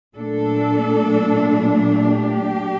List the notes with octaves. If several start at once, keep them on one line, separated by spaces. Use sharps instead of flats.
A#2 F#3 A3 D4 A4
G4